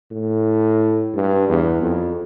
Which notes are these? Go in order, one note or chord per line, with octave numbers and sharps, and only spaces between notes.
A2
G2
E2
F2